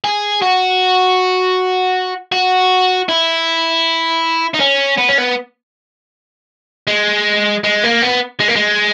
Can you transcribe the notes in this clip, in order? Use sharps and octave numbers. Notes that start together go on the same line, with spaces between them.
G#4
F#4
F#4
E4
D#4
C#4
B3
C#4
B3
G#3
G#3
A#3
B3
G#3
A#3
G#3